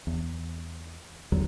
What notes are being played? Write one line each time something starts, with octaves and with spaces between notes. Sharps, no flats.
E2
E2 D3 F#3